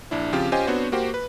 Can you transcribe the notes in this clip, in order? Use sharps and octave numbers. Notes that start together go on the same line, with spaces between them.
A#1 D4 E4
C#3 F3 C4 F4 G4
C#4 F4 G4 C5 D#5 G#5
B3 C4 D4 F#4 C5 C#5
A#3 F#4 G4 C5
B4